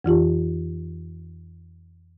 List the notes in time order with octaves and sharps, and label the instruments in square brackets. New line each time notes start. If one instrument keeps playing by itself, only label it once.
[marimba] F2 E3 F4 G4